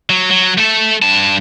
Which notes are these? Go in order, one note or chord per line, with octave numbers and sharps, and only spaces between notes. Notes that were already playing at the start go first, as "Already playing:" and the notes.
F#3
F#3
A3 A4
G2 A5